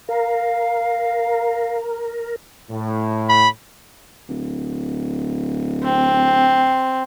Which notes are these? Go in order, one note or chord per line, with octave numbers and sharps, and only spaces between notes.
A#4 F5
A2
B5
D1
C4